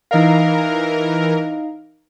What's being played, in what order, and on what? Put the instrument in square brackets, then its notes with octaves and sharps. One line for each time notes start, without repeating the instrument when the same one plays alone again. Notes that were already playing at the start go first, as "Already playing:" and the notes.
[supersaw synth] E3 A#4 [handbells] D#4 D#5 F5